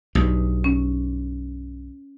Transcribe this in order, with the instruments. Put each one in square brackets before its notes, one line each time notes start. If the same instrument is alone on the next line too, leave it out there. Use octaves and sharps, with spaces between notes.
[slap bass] B1 G2
[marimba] C#4